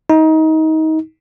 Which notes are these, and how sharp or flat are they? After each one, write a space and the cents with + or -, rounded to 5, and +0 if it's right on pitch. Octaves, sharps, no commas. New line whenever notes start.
D#4 +25